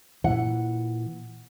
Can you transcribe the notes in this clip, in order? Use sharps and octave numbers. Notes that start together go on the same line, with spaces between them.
A#2 E3 F#5